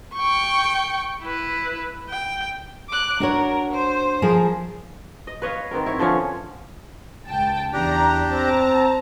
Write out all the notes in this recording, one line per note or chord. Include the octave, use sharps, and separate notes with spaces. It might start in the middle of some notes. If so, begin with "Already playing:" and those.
G5 C#6
E4 B4
G5
D6 F#6
D4 F#4 A#4 C#5
C5
F3 G#4 A#4
D#5
B4 C#5 D#5 F5
D#3 B3 C4 A#4
E4 C#5
D3 F3 C#4 C#5
C#2 G5 A5
E2 D4 G4 A#5
C4 A5 A#5